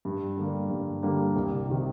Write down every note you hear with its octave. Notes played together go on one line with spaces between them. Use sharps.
G2
D3 G3 A#3
G2
D3 G3 A#3
C2
C3 D#3